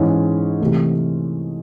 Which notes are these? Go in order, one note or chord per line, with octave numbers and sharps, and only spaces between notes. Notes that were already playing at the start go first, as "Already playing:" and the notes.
Already playing: G#2 E3 G#3 C#4 E4
C3 E3 A3